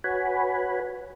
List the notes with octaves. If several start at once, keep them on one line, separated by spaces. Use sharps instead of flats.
F#4 B4 C#5 F#5 G#5 B5